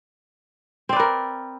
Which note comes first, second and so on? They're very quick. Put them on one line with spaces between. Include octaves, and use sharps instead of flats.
C4 D5 B4 A#4